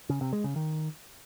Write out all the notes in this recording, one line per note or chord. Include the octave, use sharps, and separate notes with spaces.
C#3
C3
G#3
C#3
D#3